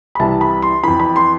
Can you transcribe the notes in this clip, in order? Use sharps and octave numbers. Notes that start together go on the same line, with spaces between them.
B5
C2 C3 E3 A5
B5
C6
F2 E3 B5
B5
C6